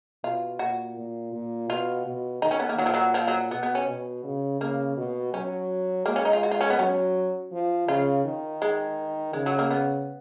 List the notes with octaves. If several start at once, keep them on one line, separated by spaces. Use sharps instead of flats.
B2 F4
A#2 F#4
A#2
A#2
B2 F4
B2
D#3 D#4
C#4
B3
A#3
A#2 F#3
F3
F#3
F3
F#3
B2 B3
B3
C#4
B2
C#3
C#3 A#3
B2
F#3 C#4
G#3 A#3
C#4
D#4
F4
F#4
F4
C#4
B3
F#3 C#4
F3
C#3 F4
D#3
G#3
C#3 G#3
F#3
A#3
B3